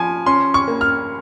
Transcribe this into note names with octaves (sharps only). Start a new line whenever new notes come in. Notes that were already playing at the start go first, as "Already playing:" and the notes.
Already playing: F3 G#5
C#4 C6
C#6
A#3
F6